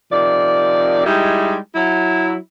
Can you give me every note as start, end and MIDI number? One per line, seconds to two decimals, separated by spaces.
0.12 1.03 48
0.12 1.03 51
0.12 1.03 53
0.12 1.03 74
1.06 1.57 55
1.06 1.57 56
1.06 1.57 63
1.06 1.57 64
1.06 1.57 67
1.75 2.35 54
1.75 2.35 64